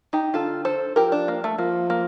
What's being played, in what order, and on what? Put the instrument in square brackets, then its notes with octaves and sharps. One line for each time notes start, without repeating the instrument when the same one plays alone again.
[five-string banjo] D#4 G4
[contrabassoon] D3 [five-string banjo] F4 A4
[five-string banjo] A4 C5
[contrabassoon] F3 [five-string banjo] G4 A#4
[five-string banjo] D4
A#3
A3
[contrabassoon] F3 [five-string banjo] A#3
[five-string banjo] A#3